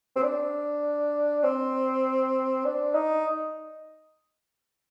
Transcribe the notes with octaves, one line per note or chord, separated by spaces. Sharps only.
C4
D4
C4
D4
D#4